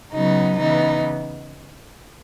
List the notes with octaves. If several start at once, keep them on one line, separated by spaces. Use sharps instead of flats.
C#3 F#3 B3 D#4
C#3 E3 B3 D#4